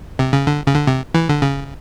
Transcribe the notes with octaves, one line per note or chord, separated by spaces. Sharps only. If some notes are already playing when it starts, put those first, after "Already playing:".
C3
C#3
D3
C#3
D3
C3
E3
D3
C#3